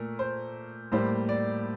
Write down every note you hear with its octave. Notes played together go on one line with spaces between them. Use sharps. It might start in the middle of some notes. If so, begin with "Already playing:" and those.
Already playing: A#2 A3 A#4
C5
A2 G3 A#3 C5
D5